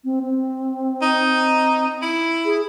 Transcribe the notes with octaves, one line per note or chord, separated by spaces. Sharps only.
C4
C4
D#4
E4
G#4